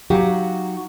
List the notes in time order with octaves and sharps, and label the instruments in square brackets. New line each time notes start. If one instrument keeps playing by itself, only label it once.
[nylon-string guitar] F#3 D#4 F#4 G4 F5 F#5